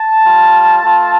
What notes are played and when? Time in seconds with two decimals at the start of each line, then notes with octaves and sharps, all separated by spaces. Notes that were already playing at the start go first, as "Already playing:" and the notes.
Already playing: A5
0.24 G3 F4
0.81 A3 F4